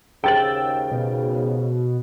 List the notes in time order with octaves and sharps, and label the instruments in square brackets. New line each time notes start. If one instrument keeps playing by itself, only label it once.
[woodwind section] D#2 G#2 C#3 [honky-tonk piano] G5 A6 F#7 [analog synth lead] E6
[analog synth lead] B2